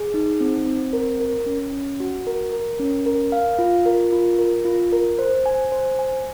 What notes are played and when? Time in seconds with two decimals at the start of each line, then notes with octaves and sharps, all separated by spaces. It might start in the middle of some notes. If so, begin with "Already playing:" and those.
Already playing: G#4
0.14 D#4
0.41 C4
0.67 C4
0.93 A#4
1.20 A#4
1.46 C#4
1.72 C#4
2.00 F#4
2.27 A#4
2.52 A#4
2.79 C#4
3.06 A#4
3.32 F5
3.59 F4
3.86 A#4
4.12 F4
4.39 A#4
4.65 F4
4.92 A#4
5.19 C5
5.46 G#5
5.72 C5
5.99 G#5